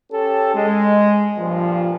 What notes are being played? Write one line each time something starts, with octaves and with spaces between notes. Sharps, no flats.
C#4 G4 A4
G#3
G2 A#2 F3